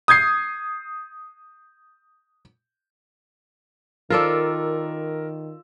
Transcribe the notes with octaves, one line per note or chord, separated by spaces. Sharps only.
D#6 G6 G#6 C7
D#3 F4 A4 A#4 D5 E6